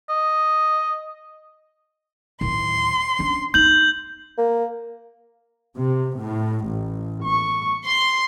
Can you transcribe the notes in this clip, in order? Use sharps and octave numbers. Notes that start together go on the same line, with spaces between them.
D#5
D1 D#3 C6
C#4 D4
A3 D#4 G6 F#7
A#3
C3
A2
A1
C#6
C6